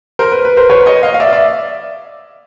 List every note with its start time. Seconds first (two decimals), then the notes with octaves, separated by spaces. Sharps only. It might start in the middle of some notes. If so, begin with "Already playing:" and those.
0.19 A#4 C5
0.32 B4
0.45 B4
0.57 A#4 C5
0.70 B4 C#5
0.86 C#5 D#5
1.03 D#5 F5
1.14 F5
1.20 D5 E5
1.33 D5 E5